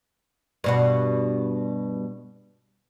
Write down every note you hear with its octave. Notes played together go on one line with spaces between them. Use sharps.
G2 B2 F#4